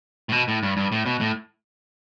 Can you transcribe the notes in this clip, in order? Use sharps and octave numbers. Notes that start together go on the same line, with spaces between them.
A2
B2
A2
G2
G2
A2
B2
A2